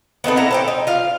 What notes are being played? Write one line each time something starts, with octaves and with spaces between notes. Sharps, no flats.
B3 C4 D#4 A4
E4 F#5 A5 A#5
A4 C5 G5
D#4
F4 F5